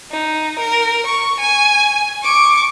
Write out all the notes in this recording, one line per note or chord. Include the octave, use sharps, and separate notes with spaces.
D#4
A#4
C#6
G#5
C#6 D6